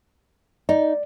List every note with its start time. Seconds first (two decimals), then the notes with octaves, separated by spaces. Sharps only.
0.69 D#4 D5